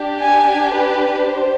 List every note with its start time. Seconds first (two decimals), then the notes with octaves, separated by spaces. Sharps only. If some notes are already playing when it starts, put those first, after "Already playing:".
Already playing: D4 G4
0.21 G#5
0.73 B4
1.25 C5